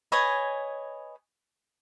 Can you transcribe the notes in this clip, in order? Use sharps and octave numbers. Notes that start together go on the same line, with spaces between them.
B4 C#5 D#5 G#5